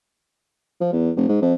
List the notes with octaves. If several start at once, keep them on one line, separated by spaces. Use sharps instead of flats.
F3
E2
F1
G#2
F2